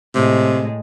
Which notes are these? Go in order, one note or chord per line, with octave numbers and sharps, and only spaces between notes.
A2 C3 G#3